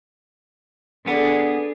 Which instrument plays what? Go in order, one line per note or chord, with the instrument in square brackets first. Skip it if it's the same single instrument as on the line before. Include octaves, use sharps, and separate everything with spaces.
[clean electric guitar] B3 [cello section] D4 G#4 [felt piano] A4